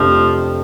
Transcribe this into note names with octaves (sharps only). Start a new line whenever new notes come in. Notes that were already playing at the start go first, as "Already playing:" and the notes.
Already playing: F2 C3 F3 A3 D4 G4